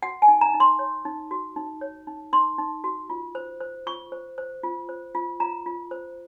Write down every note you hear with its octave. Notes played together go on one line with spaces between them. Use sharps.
F#4 F#5
G#5
D#4
A#5
D#4
C6
C#5
D#4
F#4
D#4
C#5
D#4
D#4 C6
D#4
F#4
F4
C5
C5
F4 C#6
C5
C5
F4
C5
F4
F4 A#5
F4
C5